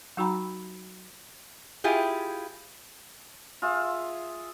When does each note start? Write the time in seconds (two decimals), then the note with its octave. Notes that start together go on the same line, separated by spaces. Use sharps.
0.17 F#3 D#4 F#4 G5 A#5 B5
1.84 E4 F4 G4 G#4
3.62 F4 G#4 E5